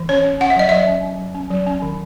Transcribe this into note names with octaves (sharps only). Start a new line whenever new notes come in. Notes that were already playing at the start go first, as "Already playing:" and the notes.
Already playing: E3
C#4 C#5
C#4
C#4 F#5
E5
F#3 D#5
F#3 E5
C#4
C#4
F#3
C#4
F#3
C#4
D#3